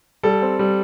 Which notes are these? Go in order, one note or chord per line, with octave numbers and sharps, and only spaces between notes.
G3 A4
C4
G3